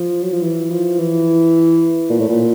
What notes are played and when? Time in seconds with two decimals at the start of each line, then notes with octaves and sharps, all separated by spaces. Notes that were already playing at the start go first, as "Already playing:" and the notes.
Already playing: F3
0.23 F#3
0.33 F3
0.42 E3
0.71 F3
0.99 E3
2.10 A#2
2.20 A2
2.29 A#2